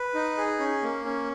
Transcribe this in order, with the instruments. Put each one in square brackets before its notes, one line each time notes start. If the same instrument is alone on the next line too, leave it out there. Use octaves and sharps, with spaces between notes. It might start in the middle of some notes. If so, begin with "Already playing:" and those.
Already playing: [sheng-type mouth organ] B4
D#4
G#4
C#4
A#3
C#4